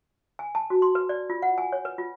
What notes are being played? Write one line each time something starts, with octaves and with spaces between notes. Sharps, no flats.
G#5
A5
F#4
C6
B4
D5
F4
F#5
G#5
C#5
B4
F4